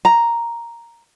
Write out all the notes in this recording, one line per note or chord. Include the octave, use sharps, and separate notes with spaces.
A#5